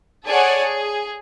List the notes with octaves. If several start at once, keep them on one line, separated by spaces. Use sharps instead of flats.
G#4 A4 C#5 D5 F#5 G#5
G#4